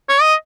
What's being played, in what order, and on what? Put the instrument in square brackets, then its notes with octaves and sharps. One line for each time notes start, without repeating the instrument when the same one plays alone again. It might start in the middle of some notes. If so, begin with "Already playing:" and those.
[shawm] C#5
D#5